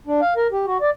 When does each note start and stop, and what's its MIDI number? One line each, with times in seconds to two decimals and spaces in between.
0.07 0.21 62
0.22 0.34 77
0.36 0.47 70
0.52 0.66 67
0.66 0.78 66
0.81 0.90 74